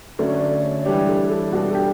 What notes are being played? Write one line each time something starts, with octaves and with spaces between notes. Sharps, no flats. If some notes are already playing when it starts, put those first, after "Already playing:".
D3 F#3 A3 C#4 D5
C#5
D5
D5
E3 G3 D4 G4 C#5
A4
A4
B2 G3 B3 D4 F#4
A4
G4